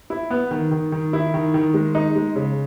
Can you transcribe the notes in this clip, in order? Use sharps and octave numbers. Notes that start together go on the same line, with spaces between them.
E4
B3
D#3
D#3
D#3
E4
D#3
D#3
G#3
D#4
G#3
C#3